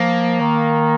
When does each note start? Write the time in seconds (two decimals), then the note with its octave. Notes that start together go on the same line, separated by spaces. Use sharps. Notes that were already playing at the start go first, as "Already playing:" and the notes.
Already playing: F3 A#3
0.40 D#3